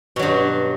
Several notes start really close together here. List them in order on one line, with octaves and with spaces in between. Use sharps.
B2 F#3 G2